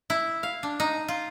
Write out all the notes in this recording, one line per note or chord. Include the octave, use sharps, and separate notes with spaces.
E4
F5
D4
D#4
F4